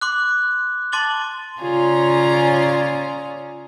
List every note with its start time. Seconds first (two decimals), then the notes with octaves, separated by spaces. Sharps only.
0.01 C6 D6 F#6
0.92 A5 C6 D6 A6 F#7 G7
1.62 C#3 F4 G#4 C#5 D5 A#5